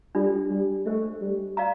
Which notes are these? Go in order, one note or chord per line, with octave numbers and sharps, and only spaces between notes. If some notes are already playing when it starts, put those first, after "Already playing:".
G3 D4 F4 A4 D5
G3
A3 D4 G4 C5 D#5
G3
D5 F5 A#5